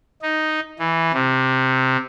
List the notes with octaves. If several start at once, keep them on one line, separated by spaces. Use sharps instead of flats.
D#4
E3
C3